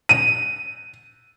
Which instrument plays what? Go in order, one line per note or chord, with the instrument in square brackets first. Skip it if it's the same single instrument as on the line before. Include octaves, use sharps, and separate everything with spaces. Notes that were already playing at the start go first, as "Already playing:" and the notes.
[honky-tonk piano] D#7